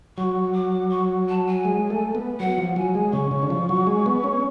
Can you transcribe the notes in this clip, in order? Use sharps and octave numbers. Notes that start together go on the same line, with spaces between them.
F#3 C#6
D6
C#6
A5
G#5
G#3
A3
B3
F#3 F#5
F3
F#3 G#5
G#3
C#3 C#6
C#3
D3
F3
F#3
G#3
B3
C#4